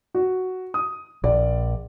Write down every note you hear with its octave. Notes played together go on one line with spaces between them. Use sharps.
F#4
D#6
A#1 D5